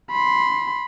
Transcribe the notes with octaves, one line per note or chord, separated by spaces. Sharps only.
B5 C6